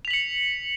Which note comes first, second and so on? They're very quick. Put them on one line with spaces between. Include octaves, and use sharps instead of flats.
F7 B6 F#7 C#7